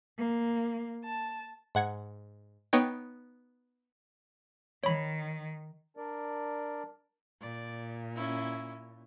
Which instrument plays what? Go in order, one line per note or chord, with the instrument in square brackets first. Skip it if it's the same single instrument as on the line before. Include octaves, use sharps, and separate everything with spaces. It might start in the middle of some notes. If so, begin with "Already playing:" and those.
[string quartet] A#3
A5
[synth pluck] G#2 F#5 G#6 C#7
B3 D#4 C#5 G5
[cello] D#3 [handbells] C#5 B5
[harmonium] D4 A#4 D5
[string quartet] A#2 [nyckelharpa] D5
[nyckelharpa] C#4 E4